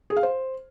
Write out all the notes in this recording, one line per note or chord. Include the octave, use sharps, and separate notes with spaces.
G#4
F5
C5